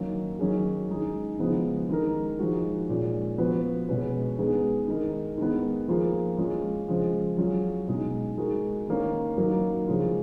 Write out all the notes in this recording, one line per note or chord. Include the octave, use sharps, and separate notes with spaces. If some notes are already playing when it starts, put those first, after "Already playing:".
Already playing: D#3 F#3 A#3 C#4
D#3 F#3 C#4 G#4
G#3 D#4 G#4
C#3 F3 G#3 B3 D#4
D#3 G#3 D#4 A#4
F3 G#3 D#4 F#4
A#2 G#3 C#4
F3 B3 F#4 B4
B2 G#3 C#4 F#4 B4
G#3 B3 D#4 G#4 B4
D#3 G#3 D#4 A#4
D#3 G#3 B3
F3 A#3 F4 G#4
G#3 C#4 F4
C#3 F3 G#3
F#3 C#4 F4 G#4
B2 G#3 D#4 G#4
G#3 D#4 F#4 A#4
D#3 A#3 C#4
F#3 A#3 D#4 F#4 A#4
C#3 F3 G#3 C#4 F4